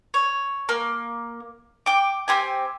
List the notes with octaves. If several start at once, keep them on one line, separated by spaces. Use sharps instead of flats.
C#5
A#3
G5 D6
C4 G4 G#5